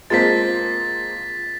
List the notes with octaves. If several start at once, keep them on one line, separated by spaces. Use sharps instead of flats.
G#3 A#3 C4 F4 A5 A6 B6